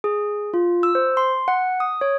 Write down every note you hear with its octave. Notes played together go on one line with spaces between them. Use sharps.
G#4
F4
E6
C5
C6
F#5
D#6
C#5